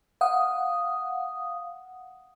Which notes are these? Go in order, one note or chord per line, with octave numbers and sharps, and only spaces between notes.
F5 F#5 D#6